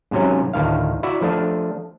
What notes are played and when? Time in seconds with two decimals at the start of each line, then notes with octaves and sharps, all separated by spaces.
0.11 G#2 C3 F#3 C#4
0.53 D2 A2 D#3 F5
1.03 E4 F#4 D5 E5
1.21 F3 A3 D4